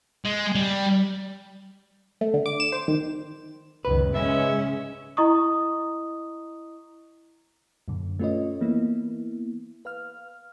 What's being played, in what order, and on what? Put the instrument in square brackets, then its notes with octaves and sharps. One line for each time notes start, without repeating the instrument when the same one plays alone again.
[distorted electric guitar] G#3
G3
[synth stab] A3
D3
D6
E7
C5
D#3
[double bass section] F#1 C#2 D#3 [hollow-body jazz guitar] B4
[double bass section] G#2 C#3 G#3 [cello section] C#4 [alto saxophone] E5
[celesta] E4 D#5 A#5 C#6 D#6
[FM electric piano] F#2 A#2 D3
A3 C#4 F4 B4 C#5 D#5
E3 A#3 B3 E4
B4 F5 F6